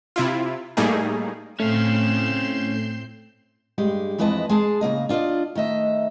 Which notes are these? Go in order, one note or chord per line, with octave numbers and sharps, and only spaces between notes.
C3 E4 F4
A2 G3 A3 A#3 D#4 G#4
A2 A3 C4 C#4 F5 G6 C7 E7
G2 G#3 G4
F2 E3 G#3 B4 D#5 A5
G#3 G#4 A5
C#3 E3 A#3 D#5
D4 F4 A#4 D5 D#5
D#3 A3 D#5 E5